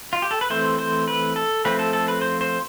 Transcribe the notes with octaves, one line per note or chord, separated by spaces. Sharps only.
F4
G4
A4
B4
E3 A3 C4 C5
C5
B4
A4
F3 A3 C4 B4
A4
A4
B4
C5
C5